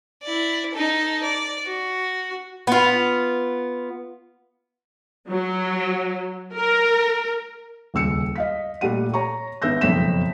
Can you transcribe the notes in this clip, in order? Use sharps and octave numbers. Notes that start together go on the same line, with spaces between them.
E4 D5
D#4 A4
D5
F#4
B3 F4
F#3
A#4
D#1 C#2 E6 C#7
D#5 F5 B6
A#2 G3 A3 F#5 D#7
C#5 A#5 C#6
G#1 B3 E5 E6 G6 A#6
F#1 F2 B2 C#5 B6 E7